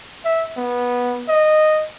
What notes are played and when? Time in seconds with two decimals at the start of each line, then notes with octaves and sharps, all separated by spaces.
0.25 E5
0.57 B3
1.28 D#5